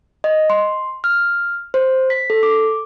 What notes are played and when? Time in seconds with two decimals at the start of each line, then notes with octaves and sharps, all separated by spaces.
0.24 D#5
0.50 C6
1.04 F6
1.74 C5
2.10 B6
2.30 A4
2.43 D6